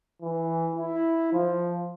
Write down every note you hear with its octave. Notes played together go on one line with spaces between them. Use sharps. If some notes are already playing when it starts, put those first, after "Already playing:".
E3
E4
F3